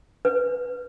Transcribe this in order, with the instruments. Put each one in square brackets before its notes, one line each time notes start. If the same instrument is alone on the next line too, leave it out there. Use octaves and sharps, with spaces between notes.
[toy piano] B4